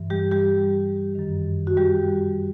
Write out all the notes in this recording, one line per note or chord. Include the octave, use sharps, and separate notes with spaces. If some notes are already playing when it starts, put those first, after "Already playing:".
Already playing: G2 E3
G3 G4
G3 G4
F#2 D#3
F#4
G3 G4